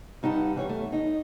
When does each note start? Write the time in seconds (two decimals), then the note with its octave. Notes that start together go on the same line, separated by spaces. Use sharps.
0.23 G2 D#4 G4 F#5 A5
0.56 E3 G3 C#5
0.69 A3
0.92 D#4